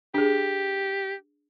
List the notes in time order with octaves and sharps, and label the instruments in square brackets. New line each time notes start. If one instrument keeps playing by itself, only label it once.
[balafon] D4 G#4 [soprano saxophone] G4